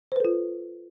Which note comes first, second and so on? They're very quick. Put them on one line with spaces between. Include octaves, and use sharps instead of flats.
C5 B4 A4 F4